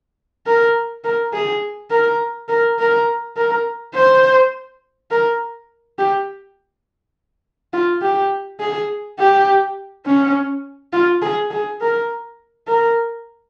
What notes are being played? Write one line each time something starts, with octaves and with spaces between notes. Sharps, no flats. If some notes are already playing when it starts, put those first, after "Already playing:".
A#4
A#4
G#4
A#4
A#4
A#4
A#4
C5
A#4
G4
F4
G4
G#4
G4
C#4
F4
G#4
G#4
A#4
A#4